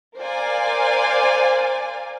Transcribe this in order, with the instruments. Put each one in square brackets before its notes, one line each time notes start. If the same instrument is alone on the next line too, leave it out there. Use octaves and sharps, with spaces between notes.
[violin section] A#4 C5 D5 F5 G#5